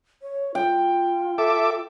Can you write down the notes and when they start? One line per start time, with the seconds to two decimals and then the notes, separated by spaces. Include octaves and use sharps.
0.22 C#5
0.55 F4 G5
1.38 A4 E5 D6